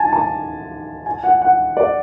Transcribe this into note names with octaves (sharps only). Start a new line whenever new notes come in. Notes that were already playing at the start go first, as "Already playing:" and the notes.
Already playing: G#5 A5
A5
G#5
F#5
F#5
D5